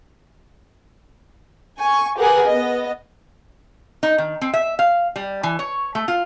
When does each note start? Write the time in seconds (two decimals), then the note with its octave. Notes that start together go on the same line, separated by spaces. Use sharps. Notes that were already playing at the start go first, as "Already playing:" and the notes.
1.81 G#5 C#6
2.17 G4 G#4 A#4 B4 F#5 G#5
2.50 B3 D#5
4.03 D#4
4.18 D#3
4.41 C4
4.54 E5
4.79 F5
5.16 G3
5.43 E3
5.59 C#5
5.95 A3
6.08 F4